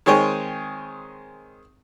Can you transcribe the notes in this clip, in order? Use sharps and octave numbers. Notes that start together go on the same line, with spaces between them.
D#3 G#3 C4 C#5 G5 G#5